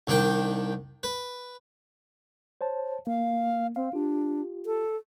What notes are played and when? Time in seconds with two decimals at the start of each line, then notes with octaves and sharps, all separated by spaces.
0.07 C2 D#3 D4 G5
1.03 B4
2.61 C5 C#5 A5
3.07 A#3 F5
3.76 C4 F5
3.93 D4 F4 G4
4.66 A4